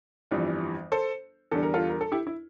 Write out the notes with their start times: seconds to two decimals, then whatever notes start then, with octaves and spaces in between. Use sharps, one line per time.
0.31 G1 F2 E3 G3
0.92 A4 C5
1.51 E2 D3 G3 A4
1.63 A#4
1.74 F4 A4
1.89 A#4
2.01 A4
2.12 E4 G4
2.27 E4